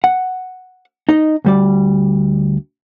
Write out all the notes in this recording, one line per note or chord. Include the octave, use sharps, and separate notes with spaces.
F#5
D#4 D#5
D2 G3 D5